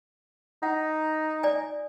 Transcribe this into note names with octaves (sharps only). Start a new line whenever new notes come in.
D#4 F#5
D5 G#5